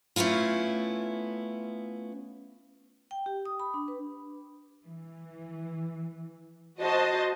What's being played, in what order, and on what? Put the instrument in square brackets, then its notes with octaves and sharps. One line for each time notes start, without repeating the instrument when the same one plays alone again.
[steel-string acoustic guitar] A3 B3 C#4 E4 F4
[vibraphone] G5
G4
D#6
B5
D4
B4
[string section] E3
F#4 C5 D#5 A5